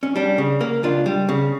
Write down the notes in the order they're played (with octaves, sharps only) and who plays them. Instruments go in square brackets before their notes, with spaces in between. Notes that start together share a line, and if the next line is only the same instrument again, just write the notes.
[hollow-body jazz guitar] C#4
G3 D4
C#3
A#3
C#2 D4 F4
G3
C#3